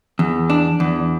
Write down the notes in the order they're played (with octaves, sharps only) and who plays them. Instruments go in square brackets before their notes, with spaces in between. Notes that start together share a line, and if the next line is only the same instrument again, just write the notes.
[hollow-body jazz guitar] E2
D4
E2